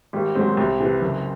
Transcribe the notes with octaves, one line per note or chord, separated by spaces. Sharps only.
G#1 G3
G#2 D#3 F#3 C4
C2
C3 E3
F#1